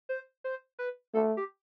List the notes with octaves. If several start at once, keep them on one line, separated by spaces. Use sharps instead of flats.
C5
C5
B4
A3 A4
G4